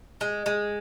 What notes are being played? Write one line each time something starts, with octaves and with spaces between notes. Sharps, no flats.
G#3
G#3